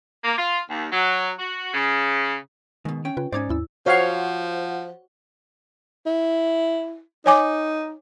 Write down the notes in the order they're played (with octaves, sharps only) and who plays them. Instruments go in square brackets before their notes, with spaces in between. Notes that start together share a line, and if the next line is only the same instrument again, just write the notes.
[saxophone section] A#3
F4
D#2
F#3
F#4
C#3
[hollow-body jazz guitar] G#2 B2 [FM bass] D#3
[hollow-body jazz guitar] C#4 G5 [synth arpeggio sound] D7
[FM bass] C#3 [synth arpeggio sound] F4 B4
[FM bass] G#2 [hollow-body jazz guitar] C#4 D#4 D5 [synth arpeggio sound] C5 D6 G#6
[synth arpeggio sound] D#2 E4 E6
[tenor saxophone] F3 [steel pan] F#4 C#5 F5 [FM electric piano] C5 F#5
[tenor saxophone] E4
[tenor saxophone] D#4 [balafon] C#5 G#5 D6